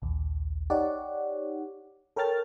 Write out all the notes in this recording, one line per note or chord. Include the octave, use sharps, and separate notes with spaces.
A#1 D#2
D#4 G4 C#5 D5 F#5
A4 A#4 C#5 G5 F6 A6